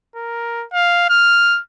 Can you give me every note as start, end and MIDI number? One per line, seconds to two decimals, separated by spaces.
0.16 0.65 70
0.73 1.07 77
1.09 1.60 89